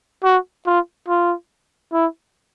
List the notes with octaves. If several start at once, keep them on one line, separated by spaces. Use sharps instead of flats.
F#4
F4
F4
E4